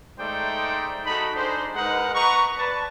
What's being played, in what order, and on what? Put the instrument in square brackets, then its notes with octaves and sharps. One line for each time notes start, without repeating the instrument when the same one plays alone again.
[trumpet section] G#3 A3 D#4 C5 D5 G5
D#4 F#4 A4 B5
D4 D#4 G#4 C5
G#3 D#4 A#4 B4 D#5 F#5
B4 A#5 C#6
B4 D5 A5